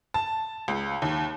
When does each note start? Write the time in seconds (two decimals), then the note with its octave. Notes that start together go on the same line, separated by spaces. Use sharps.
0.14 A5
0.68 C#2
1.02 D#2